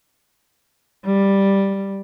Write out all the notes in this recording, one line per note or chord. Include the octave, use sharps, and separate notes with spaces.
G3